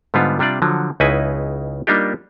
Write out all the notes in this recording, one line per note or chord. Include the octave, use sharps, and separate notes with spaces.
G#2 D3 G3 B3 F4
C3 G3 D4 F4 D5
D3 F3 F#3
C#2 C#3 D#4 E4 B4 G#5
G3 A#3 D4 D#4 F4 G4